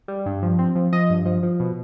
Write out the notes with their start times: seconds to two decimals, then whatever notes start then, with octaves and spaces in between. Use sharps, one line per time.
0.08 G3
0.26 G2
0.43 F3
0.59 C4
0.76 F3
0.92 F3 D#5
1.10 G2
1.26 F3
1.43 F3
1.60 B2